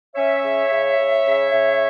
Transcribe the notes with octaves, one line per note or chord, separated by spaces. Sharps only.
C#4 C#5 E5
C#3
C#3
C#3
C#3
C#3